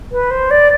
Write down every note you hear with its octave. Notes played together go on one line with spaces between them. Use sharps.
B4
C5
D5